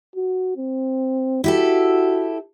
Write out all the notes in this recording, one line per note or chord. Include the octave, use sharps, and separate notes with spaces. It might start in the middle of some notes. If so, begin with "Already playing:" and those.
F#4
C4
E4 F#4 G4 A4